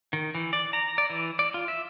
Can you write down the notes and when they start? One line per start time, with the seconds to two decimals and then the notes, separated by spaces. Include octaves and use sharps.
0.13 D#3
0.35 E3
0.53 D5
0.73 A#5
0.98 D5
1.10 E3
1.39 D5
1.54 F4
1.68 E5